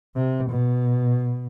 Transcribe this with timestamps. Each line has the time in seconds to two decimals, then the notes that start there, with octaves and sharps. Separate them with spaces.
0.16 C3
0.50 B2